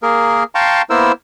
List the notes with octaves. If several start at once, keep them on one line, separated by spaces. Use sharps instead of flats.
A#3 G#4 A#4
F5 G5 A5 A#5 C6 C#6
A#3 B3 E4 A#4 C5 E6